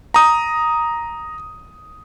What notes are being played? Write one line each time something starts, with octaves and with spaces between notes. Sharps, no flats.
A#5 D#6